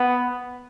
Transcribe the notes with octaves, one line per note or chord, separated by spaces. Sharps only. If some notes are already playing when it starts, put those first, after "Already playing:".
Already playing: B3